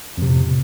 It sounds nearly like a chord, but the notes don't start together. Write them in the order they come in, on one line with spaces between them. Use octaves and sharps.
F2 C3 A2